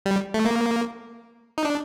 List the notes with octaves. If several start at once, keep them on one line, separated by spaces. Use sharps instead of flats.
G3
A3
A#3
D#4
D4